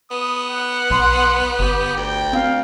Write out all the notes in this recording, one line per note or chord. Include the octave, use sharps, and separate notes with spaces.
B3 D#6
F#5
B1 C6
G1 G4
D2 G5
C4 F5